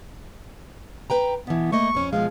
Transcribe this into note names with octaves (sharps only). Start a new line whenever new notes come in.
B4 G5 A#5
B2 E3 B3
A3 A#3 D#5 C#6
F2 C#4
B2 F3 G#3 F5